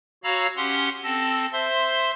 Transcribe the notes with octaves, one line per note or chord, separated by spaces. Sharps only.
F#4 C#5 F5 A#5 B5 E6
C#4 G4 F#5 C6
C4 A4 A5 A#6
C5 E5 C6